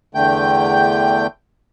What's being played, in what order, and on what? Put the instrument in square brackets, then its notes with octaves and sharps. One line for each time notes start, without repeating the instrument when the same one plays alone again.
[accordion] E2 D3 A3 G5 G6